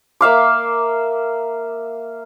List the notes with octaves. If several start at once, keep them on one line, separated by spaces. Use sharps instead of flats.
A#3 E5 F5 D6